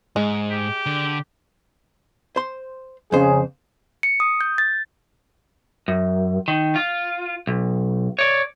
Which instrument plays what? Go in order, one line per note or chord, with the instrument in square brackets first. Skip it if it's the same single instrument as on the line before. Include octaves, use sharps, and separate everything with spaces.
[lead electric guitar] G#2 [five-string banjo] G#3
[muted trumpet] G4
[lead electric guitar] D3
[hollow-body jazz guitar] C5 C6
[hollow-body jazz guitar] F2 C5 [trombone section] C#3 G#4
[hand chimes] C#7
D#6
G6
A6
[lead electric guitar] F#2
D#3
F4
B1
C#5 D5